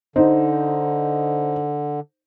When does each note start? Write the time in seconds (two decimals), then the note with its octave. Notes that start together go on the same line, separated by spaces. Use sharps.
0.16 D3 D#4 C5